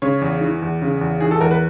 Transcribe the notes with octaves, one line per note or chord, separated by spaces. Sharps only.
C#3 C#5
E2
E3
E2
C#3
E2
E3 G#4
A4
E2 A#4
B4